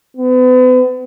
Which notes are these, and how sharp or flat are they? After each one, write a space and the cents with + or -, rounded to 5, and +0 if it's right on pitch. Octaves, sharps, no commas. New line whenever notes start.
B3 +40